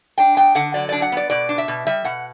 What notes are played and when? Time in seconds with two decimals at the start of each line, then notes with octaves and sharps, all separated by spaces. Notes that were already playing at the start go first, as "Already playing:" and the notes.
0.18 D4 G5
0.37 B3 G5
0.55 D3 F#5
0.74 F#3 D5
0.89 D4 D5
1.02 F#5
1.12 B3 D5
1.30 B2 D5
1.49 D4
1.58 E5
1.68 B2
1.87 G3 E5
2.04 B2 F#5